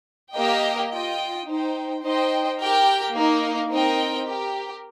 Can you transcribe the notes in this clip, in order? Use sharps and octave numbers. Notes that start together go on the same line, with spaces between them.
A#3 G4 A#4 D#5 G5
F4 D#5 G5
D#4 C5 G5
D#4 C5 D#5 G5
G4 A#4 G5
A#3 D#4 A#4
C4 D#4 A#4 D#5 G5
G4 A#4 G5